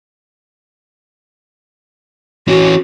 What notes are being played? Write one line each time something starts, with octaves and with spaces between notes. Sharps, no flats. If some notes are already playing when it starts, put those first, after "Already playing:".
E3 C#4 F#4